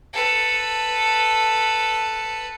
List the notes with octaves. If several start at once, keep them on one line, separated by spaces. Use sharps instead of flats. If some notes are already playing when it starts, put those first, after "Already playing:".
A4 B4